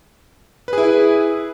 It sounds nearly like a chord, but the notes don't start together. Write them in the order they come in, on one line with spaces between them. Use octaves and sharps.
B4 G#4 E4